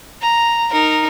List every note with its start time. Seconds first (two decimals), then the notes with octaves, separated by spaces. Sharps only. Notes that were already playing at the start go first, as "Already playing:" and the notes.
0.22 A#5
0.72 D#4 A#4